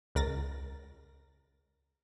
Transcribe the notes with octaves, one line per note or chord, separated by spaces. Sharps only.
C#2 A#4 A6 A#6